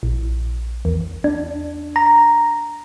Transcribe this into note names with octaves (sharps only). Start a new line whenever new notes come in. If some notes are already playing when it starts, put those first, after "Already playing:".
A#1
E2
D4
A#5